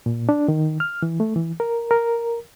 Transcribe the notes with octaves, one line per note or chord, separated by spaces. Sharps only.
A#2
D4
D#3
F6
E3
A3
E3
A#4
A#4